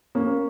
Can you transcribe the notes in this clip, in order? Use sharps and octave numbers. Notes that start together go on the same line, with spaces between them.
A#3 C#4